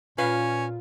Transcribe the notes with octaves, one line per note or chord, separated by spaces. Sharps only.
A#2 C#4 F4 B4 F5